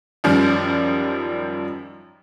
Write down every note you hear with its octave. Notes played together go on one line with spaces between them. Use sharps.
F#2 D#3 F3 G3